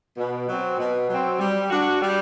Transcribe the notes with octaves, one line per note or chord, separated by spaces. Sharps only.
B2
F#3 C4
B2
F#3 C4
G3
D4 F#4
G3